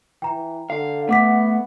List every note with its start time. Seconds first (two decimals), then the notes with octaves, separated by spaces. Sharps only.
0.22 E3 G5 A#5
0.70 D3 F5
1.09 A3 B3 F#5 D6 B6